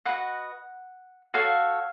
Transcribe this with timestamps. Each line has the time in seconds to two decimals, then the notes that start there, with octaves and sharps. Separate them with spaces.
0.05 F#4 B4 D#5 F#5
1.34 F#4 A4 C#5 F5